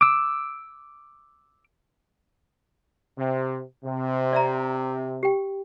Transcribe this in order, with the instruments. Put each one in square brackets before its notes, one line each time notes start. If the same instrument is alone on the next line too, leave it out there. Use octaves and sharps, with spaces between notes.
[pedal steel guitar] D6 E6
[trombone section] C3
C3
[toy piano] D5 E5 A#5
G4 G5